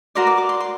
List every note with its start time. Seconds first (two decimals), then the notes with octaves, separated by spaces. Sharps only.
0.15 F#4 A#4 D5 C6
0.27 D6
0.38 D6
0.49 C6
0.60 C6